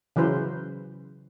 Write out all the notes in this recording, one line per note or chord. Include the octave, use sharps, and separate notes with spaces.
C#3 E3 F#3 B4 C5